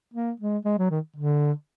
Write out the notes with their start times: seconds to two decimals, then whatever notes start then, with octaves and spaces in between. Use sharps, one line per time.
0.14 A#3
0.40 G#3
0.65 G#3
0.78 F#3
0.91 D#3
1.16 D3